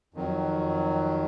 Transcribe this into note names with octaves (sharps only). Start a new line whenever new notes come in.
F2 D#3 F#3